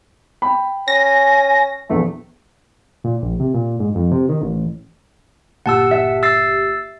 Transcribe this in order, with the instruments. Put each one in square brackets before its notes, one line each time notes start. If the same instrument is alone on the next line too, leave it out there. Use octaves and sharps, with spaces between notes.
[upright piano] G5 B5
[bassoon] C#4 [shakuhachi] G#5 [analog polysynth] A#6
[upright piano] A#1 E2 [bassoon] A3
[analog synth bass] A#2
A#1
C3
A#2
G#2
F2
C3
D#3
A1
[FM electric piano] G1 A#2 G4 [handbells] F#5 A5 E6
[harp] E5
[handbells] E6 A6 C7